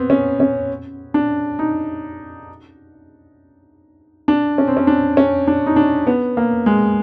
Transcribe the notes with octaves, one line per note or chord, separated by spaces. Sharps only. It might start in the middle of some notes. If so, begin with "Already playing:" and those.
Already playing: B3 C4
C#4
C#4
D4
D#4
D4
C#4
C4
C#4
D4
C#4
D4
D#4
D4
B3
A#3
G#3